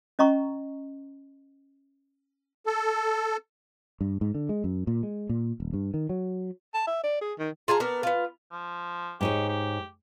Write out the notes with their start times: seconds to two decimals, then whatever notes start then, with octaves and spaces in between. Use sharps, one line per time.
0.19 C#4 D#5 A#5 C#6
2.66 A4
4.01 G2
4.21 G#2
4.35 D3
4.49 G#3
4.64 F#2
4.87 A#2
5.03 G#3
5.29 A#2
5.60 D#1
5.73 G2
5.94 D#3
6.09 F#3
6.74 A5
6.87 E5
7.04 D5
7.21 G#4
7.39 D#3
7.68 F4 G#4 A5 A#5
7.80 B3 D4 A#4
8.03 B3 F4
8.51 F3
9.21 G#2 D#4 G4 C#5
9.49 G4